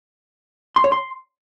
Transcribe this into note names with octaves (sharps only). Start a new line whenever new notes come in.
C6
C#5
C6